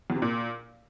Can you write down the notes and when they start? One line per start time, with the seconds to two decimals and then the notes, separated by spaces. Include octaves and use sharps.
0.10 E2
0.16 C3
0.22 A#2